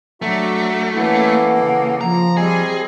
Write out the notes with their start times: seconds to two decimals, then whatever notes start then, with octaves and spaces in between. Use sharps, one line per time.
0.22 F#3 A3 D4 F#4 E5 A#5
0.95 E3 A#3 C#4 E4 A4 F#5
1.53 C#3 A#3
2.01 F3 A#5
2.37 G3 C4 G#4 D#5 G#5